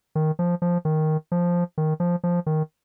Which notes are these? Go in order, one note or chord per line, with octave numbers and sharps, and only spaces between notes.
D#3
F3
F3
D#3
F3
D#3
F3
F3
D#3